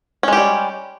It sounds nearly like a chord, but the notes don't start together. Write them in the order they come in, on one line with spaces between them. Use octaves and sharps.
C#4 G#3 G4 G3